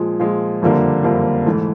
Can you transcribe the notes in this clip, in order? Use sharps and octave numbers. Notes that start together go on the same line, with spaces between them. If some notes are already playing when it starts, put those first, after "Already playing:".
Already playing: A#2 F3 G#3
A#2 F3 G#3
F#1 F2 D3 G3 A#3
F#1 F2 D3 G3 A#3
G#2 E3 A3